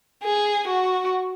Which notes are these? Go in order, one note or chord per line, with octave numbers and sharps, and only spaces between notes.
G#4
F#4